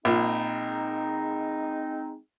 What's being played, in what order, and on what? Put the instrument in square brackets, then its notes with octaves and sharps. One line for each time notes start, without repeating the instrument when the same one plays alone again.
[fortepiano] A#1 A#2 [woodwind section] G#3 C4 D#4